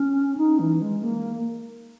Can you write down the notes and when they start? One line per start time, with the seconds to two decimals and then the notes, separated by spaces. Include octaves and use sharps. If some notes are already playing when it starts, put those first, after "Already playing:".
Already playing: C#4
0.37 D#4
0.59 E3
0.81 G#3
1.03 A#3